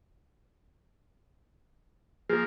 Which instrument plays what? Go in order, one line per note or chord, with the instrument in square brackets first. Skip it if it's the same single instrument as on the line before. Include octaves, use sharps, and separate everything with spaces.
[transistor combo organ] F3 A#3 [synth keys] G#4